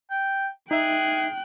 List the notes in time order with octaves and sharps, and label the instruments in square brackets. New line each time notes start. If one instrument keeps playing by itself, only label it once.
[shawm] G5
[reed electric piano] D#4 E5 [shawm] G#4 [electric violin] G5 F#6